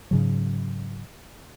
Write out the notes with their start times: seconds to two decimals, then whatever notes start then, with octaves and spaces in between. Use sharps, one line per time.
0.11 G#2 C#3 F#3